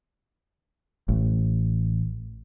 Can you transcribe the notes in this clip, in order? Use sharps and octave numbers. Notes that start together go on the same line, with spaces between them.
A1